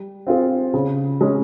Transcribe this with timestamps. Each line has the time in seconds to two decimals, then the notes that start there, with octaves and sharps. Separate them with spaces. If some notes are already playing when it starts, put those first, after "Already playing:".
Already playing: G3
0.27 C4 F4 G#4
0.74 C#3
1.21 G#3 C#4